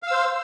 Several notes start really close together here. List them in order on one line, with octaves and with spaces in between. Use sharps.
F5 E6 C5